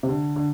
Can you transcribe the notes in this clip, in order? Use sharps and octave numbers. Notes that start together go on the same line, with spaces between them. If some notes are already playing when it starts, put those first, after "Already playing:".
C3
D3
D3